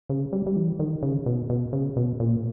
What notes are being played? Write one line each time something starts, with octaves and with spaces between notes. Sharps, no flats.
C#3
G3
G3
E3
D#3
C#3
B2
B2
C#3
B2
A#2